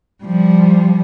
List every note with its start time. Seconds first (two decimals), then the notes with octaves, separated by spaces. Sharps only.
0.24 F3 G3